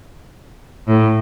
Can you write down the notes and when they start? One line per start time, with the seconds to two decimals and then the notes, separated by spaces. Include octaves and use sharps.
0.87 A2